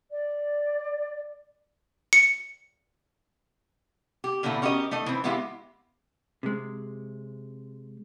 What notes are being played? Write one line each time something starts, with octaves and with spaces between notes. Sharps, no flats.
D5
C#7
G4
A#2 D3 E3 A3 B3
C#4 F#4 G4 A#4 C5 D#5
A3 D#4 D#5
E3 C4
G#3 B3 E4 F4 G4
C3 G#3